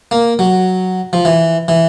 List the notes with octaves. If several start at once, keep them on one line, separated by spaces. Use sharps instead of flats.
A#3
F#3
F3
E3
E3